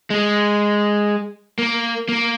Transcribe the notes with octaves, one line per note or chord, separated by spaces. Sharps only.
G#3
A#3
A#3